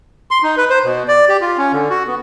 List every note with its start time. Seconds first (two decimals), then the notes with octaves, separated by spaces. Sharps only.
0.31 C6
0.43 D#4
0.57 B4
0.70 C5
0.84 B2
1.08 D5
1.29 G4
1.41 F4
1.58 C#4
1.73 D3
1.90 F#4
2.07 B3